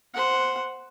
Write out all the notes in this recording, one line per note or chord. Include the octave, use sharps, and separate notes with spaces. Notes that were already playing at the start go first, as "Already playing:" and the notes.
C5 F#5